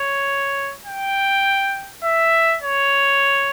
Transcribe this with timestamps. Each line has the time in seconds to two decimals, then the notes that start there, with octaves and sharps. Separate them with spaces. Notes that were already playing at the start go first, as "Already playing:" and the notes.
Already playing: C#5
0.86 G5
2.04 E5
2.62 C#5